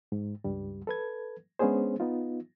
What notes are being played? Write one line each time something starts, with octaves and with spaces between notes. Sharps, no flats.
G#2
C#2 G2 G3
A4 B4 G#6
G#3 B3 C#4 D4 G#4 C5
B3 D#4 F4